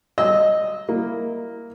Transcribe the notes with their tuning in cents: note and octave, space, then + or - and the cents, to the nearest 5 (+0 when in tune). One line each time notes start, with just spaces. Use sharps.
D#5 +0 E6 -20
A#3 +0 E4 +5